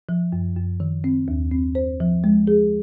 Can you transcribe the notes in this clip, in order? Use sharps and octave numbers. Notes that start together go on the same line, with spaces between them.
F3
F#2
F#2
D#3
C4
D#2
C4
C5
F3
G#3
G#4